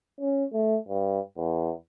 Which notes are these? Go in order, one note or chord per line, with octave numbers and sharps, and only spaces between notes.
C#4
A3
G2
E2